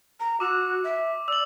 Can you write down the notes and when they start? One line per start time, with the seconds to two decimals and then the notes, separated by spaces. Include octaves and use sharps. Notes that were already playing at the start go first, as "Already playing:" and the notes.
0.20 A#5
0.40 F#4 D6 E6 E7
0.84 E5
1.28 D5 E6 F#7